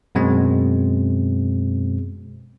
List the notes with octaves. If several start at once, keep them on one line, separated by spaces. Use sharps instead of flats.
F#2 B2 G#3 C4